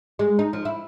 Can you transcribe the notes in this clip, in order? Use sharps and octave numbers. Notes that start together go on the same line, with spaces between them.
G#3
D#4
F3
E4